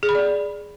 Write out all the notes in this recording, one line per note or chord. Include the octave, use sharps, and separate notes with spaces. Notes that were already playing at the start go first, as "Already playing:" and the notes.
G#4
B5
D5